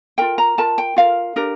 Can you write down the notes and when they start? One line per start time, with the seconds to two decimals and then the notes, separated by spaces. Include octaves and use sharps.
0.18 F4 A#4 G5
0.38 A#5
0.58 F4 A#4 A5
0.78 G5
0.97 F4 A#4 F5
1.36 D4 G4 A#4